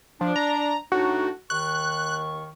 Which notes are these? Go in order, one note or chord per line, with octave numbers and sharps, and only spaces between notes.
F3 D4
A#5
A2 D4 D#4 F#4
D#2 D#3 C#6 F#6